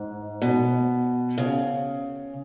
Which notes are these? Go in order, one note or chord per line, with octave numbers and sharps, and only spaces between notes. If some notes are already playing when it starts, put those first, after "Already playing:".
Already playing: G#2
B2
C#3